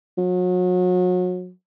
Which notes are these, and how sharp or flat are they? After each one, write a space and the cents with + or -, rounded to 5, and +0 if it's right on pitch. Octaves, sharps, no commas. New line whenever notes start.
F#3 -35